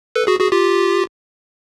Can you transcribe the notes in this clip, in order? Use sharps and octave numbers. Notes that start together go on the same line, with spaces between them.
A4 B4
F#4 G#4
F#4 G#4
F4 G4